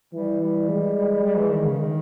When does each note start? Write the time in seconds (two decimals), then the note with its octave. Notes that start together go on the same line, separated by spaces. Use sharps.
0.13 E3 G3
0.40 G3
0.69 G#3
1.23 G3
1.37 E3
1.51 D#3
1.65 C#3
1.79 D#3